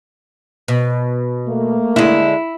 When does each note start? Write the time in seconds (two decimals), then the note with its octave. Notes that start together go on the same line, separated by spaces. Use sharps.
0.68 B2
1.48 A3 A#3
1.96 D3 G#3 E4